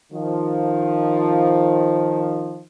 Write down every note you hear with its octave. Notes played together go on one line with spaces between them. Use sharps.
D#3 F3